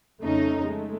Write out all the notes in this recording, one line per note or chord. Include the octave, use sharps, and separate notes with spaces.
F2 C#3 A3 C#4 D#4
G#3 A3